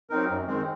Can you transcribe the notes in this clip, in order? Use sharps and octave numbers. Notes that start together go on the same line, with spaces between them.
F#3 C4 D#4 A#4
F#2
D#3 G#3 C4